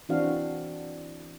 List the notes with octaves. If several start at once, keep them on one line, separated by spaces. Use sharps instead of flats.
E3 C4 D4 F#4 F5